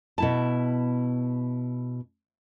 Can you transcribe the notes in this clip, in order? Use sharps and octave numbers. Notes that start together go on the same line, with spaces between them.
B2 E4 A5